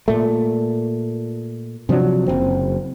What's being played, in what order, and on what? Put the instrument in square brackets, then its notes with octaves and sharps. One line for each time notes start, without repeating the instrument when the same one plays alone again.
[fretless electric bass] A#2 A3
C3 F3 F#3 D4
F#1 C4